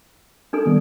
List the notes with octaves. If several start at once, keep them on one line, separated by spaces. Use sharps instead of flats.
D4 D#4 A4
D#3 G3 B3